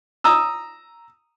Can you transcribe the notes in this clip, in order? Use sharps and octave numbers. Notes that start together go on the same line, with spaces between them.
A#5 D#6 E6